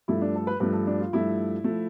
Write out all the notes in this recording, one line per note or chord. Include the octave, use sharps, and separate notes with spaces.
G2 F3 A3 E4
D4
A4
B4
G2 F3 A3 B4
A4
D4
F4
G2 F3 A3 E4
F3 A3